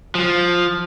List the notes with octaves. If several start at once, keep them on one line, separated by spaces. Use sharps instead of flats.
F3